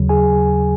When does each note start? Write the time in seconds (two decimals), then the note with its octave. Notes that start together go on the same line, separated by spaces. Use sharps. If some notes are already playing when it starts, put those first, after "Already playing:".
Already playing: D#2 C#3 F#3
0.09 G#4 G#5